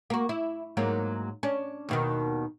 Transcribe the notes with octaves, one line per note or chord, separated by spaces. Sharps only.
A#3 F#4
E4
G#2 F#3 A#3
C#4 D4
D#2 B2 D#3